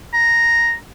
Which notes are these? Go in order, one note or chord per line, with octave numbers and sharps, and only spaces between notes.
A#5